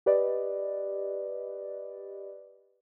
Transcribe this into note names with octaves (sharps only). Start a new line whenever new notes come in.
G4 B4 D5 D#5